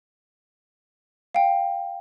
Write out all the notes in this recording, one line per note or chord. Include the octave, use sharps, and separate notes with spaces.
F5 G5